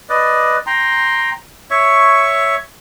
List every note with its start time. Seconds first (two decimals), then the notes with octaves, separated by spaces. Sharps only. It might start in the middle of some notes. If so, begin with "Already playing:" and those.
0.09 B4 D5 D#5
0.67 G5 A#5 C6
1.71 C#5 E5 C#6